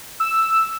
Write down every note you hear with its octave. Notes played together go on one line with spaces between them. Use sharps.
E6